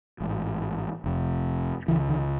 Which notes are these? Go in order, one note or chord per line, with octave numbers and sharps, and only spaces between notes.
A1 G#2
F1 F2 C3
C#2 C#3 E3
D#3